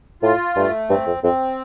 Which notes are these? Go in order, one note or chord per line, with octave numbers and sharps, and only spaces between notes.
A2 F4
G2 A3
G2 C4
F2
F2 C4